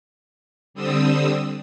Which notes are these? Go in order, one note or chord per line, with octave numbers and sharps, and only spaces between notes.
D3 G3 C4 D#6 E6